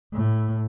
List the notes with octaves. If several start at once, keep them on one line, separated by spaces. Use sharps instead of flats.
A2